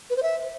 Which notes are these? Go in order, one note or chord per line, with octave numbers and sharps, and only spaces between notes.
B4
C5
E5